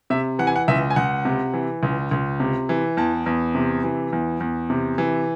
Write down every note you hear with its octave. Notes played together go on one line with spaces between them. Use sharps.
C3 E5
E3 F#5
G#5
F#5
C#2 E5
G#5
C#2 F#5
C3
E3
C#2
C#2
C3
E3
E2 A5
E2
C3
E3
E2
E2
C3
E3